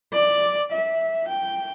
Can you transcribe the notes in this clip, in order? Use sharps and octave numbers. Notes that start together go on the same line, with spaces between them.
D5
E5
G5